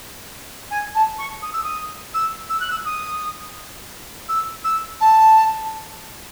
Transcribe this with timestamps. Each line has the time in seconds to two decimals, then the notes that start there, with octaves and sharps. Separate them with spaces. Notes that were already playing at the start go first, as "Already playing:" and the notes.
0.70 G#5
0.94 A5
1.18 C#6
1.42 D#6
1.53 E6
1.63 D#6
2.14 E6
2.49 E6
2.60 F#6
2.70 E6
2.85 D#6
4.28 E6
4.64 E6
5.00 A5